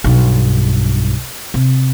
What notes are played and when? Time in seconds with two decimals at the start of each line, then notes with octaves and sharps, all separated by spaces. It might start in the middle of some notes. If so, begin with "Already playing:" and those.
0.04 B1 G2
1.54 C3